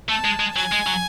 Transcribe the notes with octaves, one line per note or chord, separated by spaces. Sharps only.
A3 A5
G#3
G#3
F#3 G#5
G#3
F#3